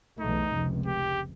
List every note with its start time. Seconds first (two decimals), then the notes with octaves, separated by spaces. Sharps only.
0.20 B1 E2 A3 D#4
0.51 F1 C#2 C3
0.86 G4